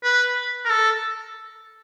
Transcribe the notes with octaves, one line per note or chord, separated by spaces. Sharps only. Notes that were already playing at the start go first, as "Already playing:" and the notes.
B4
A#4
A4